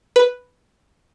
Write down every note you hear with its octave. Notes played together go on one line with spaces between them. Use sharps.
B4